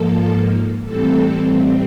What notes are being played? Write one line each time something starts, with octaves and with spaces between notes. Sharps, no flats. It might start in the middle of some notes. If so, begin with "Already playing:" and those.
Already playing: G#2 F3 A#3 A4
A2 E3 G3 C4 A4